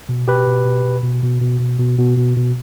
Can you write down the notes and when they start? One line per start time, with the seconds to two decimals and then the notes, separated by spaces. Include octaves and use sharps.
0.09 B2
0.27 B2 G4 B4
0.47 B2
0.65 B2
0.84 B2
1.03 B2
1.23 B2
1.41 B2
1.60 B2
1.79 B2
1.98 B2
2.17 B2
2.36 B2